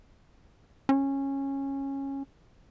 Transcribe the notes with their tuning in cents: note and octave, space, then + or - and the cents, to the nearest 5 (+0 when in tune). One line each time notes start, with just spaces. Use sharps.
C#4 -15